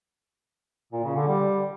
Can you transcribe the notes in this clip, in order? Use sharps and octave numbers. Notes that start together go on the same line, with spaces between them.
A#2
C#3
D3
G3